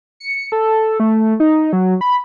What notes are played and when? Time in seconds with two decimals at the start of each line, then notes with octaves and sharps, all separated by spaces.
0.20 C#7
0.52 A4
1.00 A3
1.40 D#4
1.73 F#3
2.01 B5